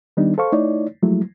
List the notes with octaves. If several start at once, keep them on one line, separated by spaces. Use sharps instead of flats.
D#3 G3 B3 D4 D#4
A4 C5 F5 C#6
A3 D#4 E4 C#5 D5
F3 F#3 G#3 A3 E4